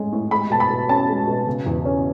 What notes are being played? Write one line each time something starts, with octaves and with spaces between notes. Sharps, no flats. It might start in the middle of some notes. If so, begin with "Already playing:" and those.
Already playing: A2 G#3 C#4
A2
G#3 B5
B2 A5
B5
B2
C#4 A5
G#3
B2
C#3
E2
C#4